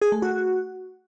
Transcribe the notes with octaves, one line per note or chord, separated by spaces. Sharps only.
G#4
A3
F#4